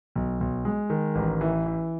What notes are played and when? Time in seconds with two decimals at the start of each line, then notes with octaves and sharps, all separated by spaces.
0.15 B1
0.41 B1
0.65 G#3
0.90 D#3
1.15 A1
1.41 E3
1.66 E3